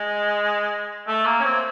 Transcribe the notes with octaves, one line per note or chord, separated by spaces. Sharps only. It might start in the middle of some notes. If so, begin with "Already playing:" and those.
Already playing: G#3
A3
A#3
C#4
C4